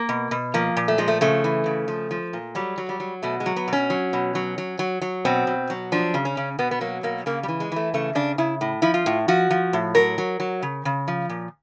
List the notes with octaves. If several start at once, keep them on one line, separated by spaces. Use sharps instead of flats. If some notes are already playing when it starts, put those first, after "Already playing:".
Already playing: A#3
B2
B2
F3 A#3
A#2
A3
F3 G#3
A3
C#3 A3
E3
C#3
F3
F3
A#2
F#3 G3
F#3
G3
F#3
B2 A3
G#3
F#3
B3
B2 C#4
F#3
B2
F#3
F#3
F#3
F#3
B2 C4
B2
F#3
F3 D4
C#3
C#4
C#3
B2 B3
B3
F#3 A#3
B2 A#3
C#3 A#3
G3
E3
G#3
E3 A3
C#3 A3
C#3 D4
C#3 E4
A2
F3 E4
F4
A2
F3 F#4
F3
A2
F#3 A#4
F#3
F#3
C#3
C#3
F3
A#2